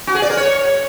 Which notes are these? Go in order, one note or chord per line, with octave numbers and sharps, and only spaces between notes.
F#4
G#4
D5
A#4
C#5